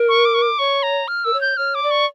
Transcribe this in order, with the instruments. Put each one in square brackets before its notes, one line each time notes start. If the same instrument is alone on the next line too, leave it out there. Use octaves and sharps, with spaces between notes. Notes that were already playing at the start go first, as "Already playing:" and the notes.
Already playing: [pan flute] A#4
[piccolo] C#6
D6
C#6
D6
[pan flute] C#5 [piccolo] C#6
[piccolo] A#5
F6
[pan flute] A#4 [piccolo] E6
[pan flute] C#5
[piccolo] G6
[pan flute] C#5 [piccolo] F6
[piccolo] D6
[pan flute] D5
[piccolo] C#6